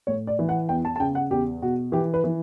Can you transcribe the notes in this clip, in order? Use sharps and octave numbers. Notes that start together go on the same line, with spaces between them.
A2 C#5
D5
E3
F#5
E2 G5
A5
A5
C#3 G5
F#5
E2 G4
B2 F#4
E3 G4
B4
E3